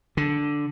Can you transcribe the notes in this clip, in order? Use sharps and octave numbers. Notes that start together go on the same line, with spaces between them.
D3